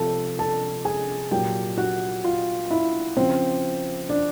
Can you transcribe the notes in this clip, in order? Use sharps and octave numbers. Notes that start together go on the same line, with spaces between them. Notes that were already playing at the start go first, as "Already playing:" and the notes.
Already playing: C3 F3 A4 A5
A4 A5
G#4 G#5
A#2 F#3 G4 G5
F#4 F#5
F4 F5
E4 E5
C#3 F3 C4 C5
D4 D5